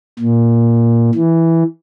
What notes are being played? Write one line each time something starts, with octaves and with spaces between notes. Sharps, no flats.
A#2
E3